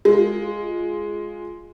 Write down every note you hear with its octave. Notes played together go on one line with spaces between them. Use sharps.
G#3 F4